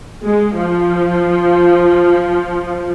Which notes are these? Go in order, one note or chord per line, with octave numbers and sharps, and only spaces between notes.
G#3
F3